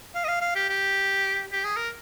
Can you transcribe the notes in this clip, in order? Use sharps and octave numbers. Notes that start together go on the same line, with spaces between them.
F5
D#5
F5
F5
G4
G4
G4
G#4
A#4